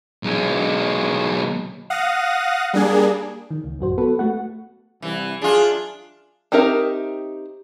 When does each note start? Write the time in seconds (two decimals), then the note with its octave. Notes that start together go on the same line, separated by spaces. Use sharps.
0.23 B1 G#3
1.90 F5 F#5 D#6 A#6
2.74 G3 A#3 D4 G#4
3.51 D#3
3.64 C#2
3.79 A1 F#2 F#4 C5
3.98 B3 F#4 A4 B4
4.19 A3 F#4 F#5
5.02 C2 E3
5.41 F#2 D4 F4 G#4
6.52 C4 D#4 G4 A#4 E5